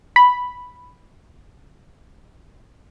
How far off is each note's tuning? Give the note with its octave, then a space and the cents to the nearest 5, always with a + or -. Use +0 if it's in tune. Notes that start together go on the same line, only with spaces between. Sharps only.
B5 +0